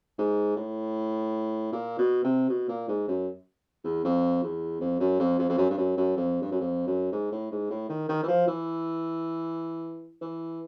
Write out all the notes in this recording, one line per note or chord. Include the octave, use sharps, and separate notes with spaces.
G#2
A2
A#2
B2
C3
B2
A#2
G#2
F#2
E2
F2
E2
F2
F#2
F2
F2
F2
F#2
G2
F#2
F#2
F2
G2
F#2
F2
F#2
G#2
A2
G#2
A2
D#3
D#3
E3
F3
E3
E3